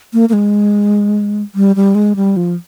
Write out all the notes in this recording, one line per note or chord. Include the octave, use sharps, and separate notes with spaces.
A#3
A#3
G#3
G3
G3
G#3
G3
F3